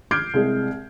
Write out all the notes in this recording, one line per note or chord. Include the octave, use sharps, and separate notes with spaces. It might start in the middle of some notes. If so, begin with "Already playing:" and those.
D6 F6 G6 G#6 C7 D7
C2 G#3 G#4